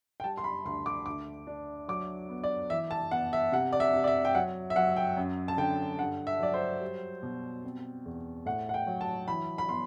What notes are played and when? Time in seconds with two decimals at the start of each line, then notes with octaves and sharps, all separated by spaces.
0.20 G5
0.24 G3 A5
0.37 C6
0.44 B5
0.65 D2 C6
0.86 D6
1.06 D2 D6
1.47 D4
1.88 F#3 D6
2.29 B3
2.44 D5
2.70 E3 E5
2.91 A5
3.11 B3 F#5
3.33 E5
3.52 C3 F#5
3.73 D5
3.80 E5
3.93 C3
4.04 D5
4.07 E5
4.25 G5
4.35 F#3 F#5
4.70 E5
4.76 F#3 F#5
4.97 G5
5.17 F#2
5.48 A5
5.58 D3 G5
5.99 G2 F#5
6.27 E5
6.40 F#3 D5
6.54 C5
6.81 G3
7.23 B2
7.64 C4
8.06 E2
8.46 A2 F#5
8.69 F#5
8.74 G5
8.87 F#3
9.01 A5
9.28 E3 B5
9.58 B5
9.69 B3 C6